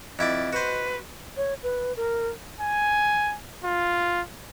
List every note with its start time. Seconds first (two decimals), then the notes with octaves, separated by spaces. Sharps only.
0.19 F2 E4 D5 D#5
0.53 F#4 B4 C5
1.37 C#5
1.63 B4
1.96 A#4
2.60 G#5
3.65 F4